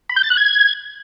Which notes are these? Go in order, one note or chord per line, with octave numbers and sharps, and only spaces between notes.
B5
G6
A6
F#6
G#6